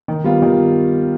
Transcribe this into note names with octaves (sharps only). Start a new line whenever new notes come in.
D#3
G3 B3 F4
D#3